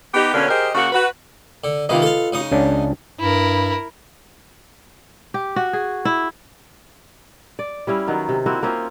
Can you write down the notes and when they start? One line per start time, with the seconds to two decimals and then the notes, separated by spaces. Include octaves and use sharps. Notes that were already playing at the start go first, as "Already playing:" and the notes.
0.14 B3 D#4 G4
0.34 B2 D3 A#3 C#4
0.49 G4 G#4 A#4 C5 D#5
0.75 C#3 A#3 F#4
0.93 F#4 B4
1.64 D3
1.89 C3 D#3 A#3 F4 B4 D#5
2.02 A4 F5
2.33 C#3 D#4 D#6
2.52 C#2 C#4 D4
3.20 G2 E4 A#4
5.34 G4
5.56 F#4
5.73 G#4
6.05 E4
7.59 D5
7.87 G3 C#4 E4 F5
8.07 D#3 F#3 B3
8.29 C3
8.46 A#3 C4 E4 F#4
8.63 A#3 C4 C#4 F4